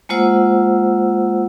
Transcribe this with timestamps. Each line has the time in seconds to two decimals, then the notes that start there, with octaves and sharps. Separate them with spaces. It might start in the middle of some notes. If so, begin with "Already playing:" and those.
0.09 G#3 A#3 F4 C5 F#5 E6